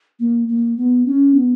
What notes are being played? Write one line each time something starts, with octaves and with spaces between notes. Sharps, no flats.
A#3
A#3
B3
C#4
B3